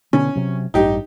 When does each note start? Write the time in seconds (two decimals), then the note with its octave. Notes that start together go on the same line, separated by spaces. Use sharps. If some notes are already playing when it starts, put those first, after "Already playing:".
0.13 B2 D3 B3 C#4
0.35 C3 F#3
0.74 A1 G2 D#4 G4